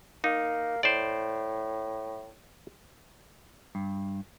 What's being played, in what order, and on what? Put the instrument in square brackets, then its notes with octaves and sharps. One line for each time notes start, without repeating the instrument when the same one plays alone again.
[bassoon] A#3 [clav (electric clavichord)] D#4
[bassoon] A2 [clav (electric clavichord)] C5 D5
[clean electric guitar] G2